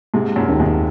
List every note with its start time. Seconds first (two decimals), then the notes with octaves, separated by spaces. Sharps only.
0.14 G#2 C3 G#3
0.36 F#2 A#2
0.49 D#2
0.59 G#2 C3